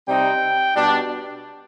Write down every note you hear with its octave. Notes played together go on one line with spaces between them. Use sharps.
C3 G3 C4 D#4 G5
B2 G3 D4